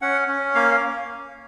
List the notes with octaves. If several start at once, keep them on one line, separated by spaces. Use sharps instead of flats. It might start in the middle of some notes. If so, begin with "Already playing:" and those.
C#4 F#5
C#4
A#3 F5